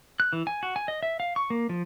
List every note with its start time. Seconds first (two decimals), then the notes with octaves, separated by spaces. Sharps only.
0.20 F#6
0.33 E3
0.47 G#5
0.63 F#4
0.76 G#5
0.88 D#5
1.03 E5
1.20 F5
1.36 C#6
1.50 A#3
1.69 F3